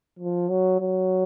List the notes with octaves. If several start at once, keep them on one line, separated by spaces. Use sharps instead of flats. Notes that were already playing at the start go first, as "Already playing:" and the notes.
F3
F#3
F#3